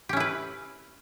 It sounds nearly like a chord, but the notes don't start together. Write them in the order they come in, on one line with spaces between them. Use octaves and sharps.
G4 C#4 E4 B4